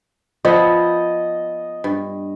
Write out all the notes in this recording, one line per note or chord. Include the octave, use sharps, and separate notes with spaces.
F3 B3 E4 D#5
G2